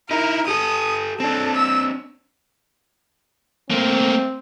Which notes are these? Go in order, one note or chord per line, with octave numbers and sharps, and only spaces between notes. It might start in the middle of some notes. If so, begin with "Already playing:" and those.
D#4 E4 A#4
G4 A4 D#6
C4 D4 A4
E6
A3 A#3 C4